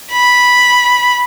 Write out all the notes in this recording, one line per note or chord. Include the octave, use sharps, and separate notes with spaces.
B5